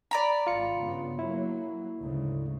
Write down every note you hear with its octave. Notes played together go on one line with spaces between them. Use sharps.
D5 A#5 B5
G#1 G#2 F4 C#7
G2 C#3 B3
F#3 A#3 E4
D2 G#2 C#3